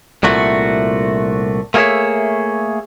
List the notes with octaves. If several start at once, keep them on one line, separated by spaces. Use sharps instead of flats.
C2 A#2 A3 F#4
A3 A#3 G4 G#4 C#5 E5